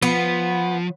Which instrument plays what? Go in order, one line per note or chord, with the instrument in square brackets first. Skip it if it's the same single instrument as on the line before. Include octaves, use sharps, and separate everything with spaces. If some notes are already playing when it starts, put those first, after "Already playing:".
[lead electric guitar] F3 [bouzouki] B3